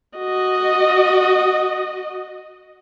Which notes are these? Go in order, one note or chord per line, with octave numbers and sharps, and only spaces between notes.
F#4 D#5